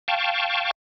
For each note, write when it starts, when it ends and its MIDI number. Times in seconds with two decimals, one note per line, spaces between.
0.08 0.71 77
0.08 0.71 79
0.08 0.71 81
0.08 0.71 85